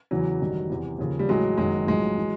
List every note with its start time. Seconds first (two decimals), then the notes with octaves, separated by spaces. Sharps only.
0.11 E2 C#3 E3 F#3
0.40 A1 G2 D#3
0.70 E2 C3 E3
0.99 D#2 C#3 F3
1.19 G3
1.29 A1 A2 E3 F#3 G#3
1.58 F#1 F#2 D#3 F#3 G#3
1.87 B1 A2 F3 F#3 G#3
2.17 E3